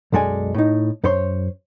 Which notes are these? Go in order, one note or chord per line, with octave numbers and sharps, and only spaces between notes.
B1 F#2 G#3 A4 D5 G#5
A2 D#4
F#2 C5 C#5 C6